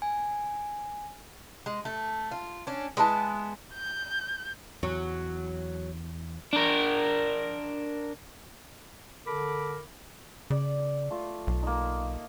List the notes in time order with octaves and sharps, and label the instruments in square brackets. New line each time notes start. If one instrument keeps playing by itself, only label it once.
[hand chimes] G#5
[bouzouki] G#3
A3
F4
C#4 D4
G#3 B3 E4 A5
[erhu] G6
[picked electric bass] E2 [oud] F#3
[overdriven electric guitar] D4 A#4
[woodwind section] D3 A4 A#4 B5 D6
[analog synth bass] C#3 [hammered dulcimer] D5
[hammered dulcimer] A3 F4
[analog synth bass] B1
[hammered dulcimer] A#3 D#4